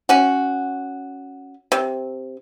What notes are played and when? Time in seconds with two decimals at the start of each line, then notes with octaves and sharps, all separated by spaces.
0.09 C#4 F#4
1.72 C3